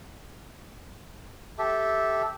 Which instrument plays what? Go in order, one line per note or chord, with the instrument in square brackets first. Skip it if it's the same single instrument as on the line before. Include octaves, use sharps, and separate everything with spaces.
[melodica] G4 A4 E5